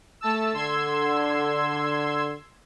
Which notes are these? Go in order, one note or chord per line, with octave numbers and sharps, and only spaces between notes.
A3 A5 E6
D3 C6 E6 G#6